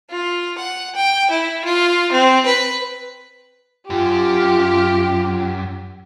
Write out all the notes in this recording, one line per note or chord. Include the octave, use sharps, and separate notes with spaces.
F4
F#5
G5
E4
F4
C4
B4
F#2 F4 G4